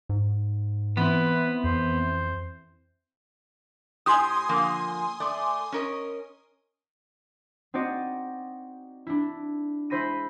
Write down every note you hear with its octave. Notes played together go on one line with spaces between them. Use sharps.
G#2
E3 B3 C4 B4
F2 C5
A2 G4 G#5 C6 D#6
D3 F3 A#3
A3 D5
C#4 A#4 D#5
C4 D#4 F#4 D5 D#5
D4 E4
G#3 E4 C5 B5 A#6 D#7